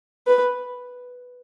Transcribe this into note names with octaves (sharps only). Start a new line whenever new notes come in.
B4